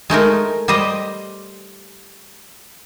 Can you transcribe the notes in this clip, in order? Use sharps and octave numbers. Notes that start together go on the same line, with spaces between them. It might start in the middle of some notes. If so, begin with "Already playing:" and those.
G#3 A3 D#4 A#4
G3 G4 C5 D#5